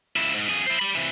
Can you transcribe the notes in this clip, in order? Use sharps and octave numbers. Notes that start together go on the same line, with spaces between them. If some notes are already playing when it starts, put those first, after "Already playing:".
C#2 E4
G#2
F2 G#4
E4 C5
G4 B5
C3 E3